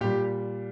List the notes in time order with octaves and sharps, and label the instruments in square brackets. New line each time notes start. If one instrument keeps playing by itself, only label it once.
[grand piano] A#2 G3 G4